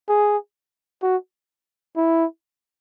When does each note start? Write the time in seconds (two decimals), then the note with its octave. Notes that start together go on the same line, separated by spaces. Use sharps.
0.09 G#4
1.03 F#4
1.97 E4